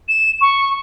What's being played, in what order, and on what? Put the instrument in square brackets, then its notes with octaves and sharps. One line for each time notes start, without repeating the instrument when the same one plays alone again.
[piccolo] E7
C#6